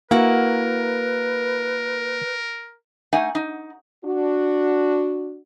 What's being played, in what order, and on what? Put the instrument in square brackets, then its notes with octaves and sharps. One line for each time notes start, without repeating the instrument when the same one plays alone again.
[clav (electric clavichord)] A#3 [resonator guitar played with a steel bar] E4 F#4 [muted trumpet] A#4 [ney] B4
[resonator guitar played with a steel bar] A3 D#4 F#5 G#5
D#4
[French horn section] D4 F#4